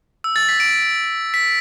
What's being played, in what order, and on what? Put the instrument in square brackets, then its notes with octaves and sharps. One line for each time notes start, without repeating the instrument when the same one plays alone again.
[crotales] E6
A6
B6
D7
B6